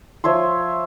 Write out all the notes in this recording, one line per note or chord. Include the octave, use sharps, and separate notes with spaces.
F3 C#5 E5 C6